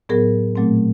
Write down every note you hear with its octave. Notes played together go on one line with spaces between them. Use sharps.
A2 F#3 B3 G#4 A#4
A#2 F#3 A3 C4